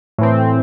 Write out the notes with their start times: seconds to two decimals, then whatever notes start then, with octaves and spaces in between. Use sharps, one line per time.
0.18 A2 E3 C4